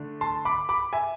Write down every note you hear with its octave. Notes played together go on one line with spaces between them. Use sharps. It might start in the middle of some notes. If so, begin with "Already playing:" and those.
Already playing: D3 A3 D4
A5 C6
B5 D6
B5 D6
E5 G#5